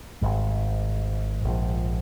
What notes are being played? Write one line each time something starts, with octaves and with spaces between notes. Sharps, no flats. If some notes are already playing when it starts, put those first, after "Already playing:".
G#1 G#2 G3
A#1 G#2 F3